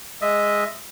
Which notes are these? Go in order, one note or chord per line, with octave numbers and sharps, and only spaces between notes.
G#3 D#5 E5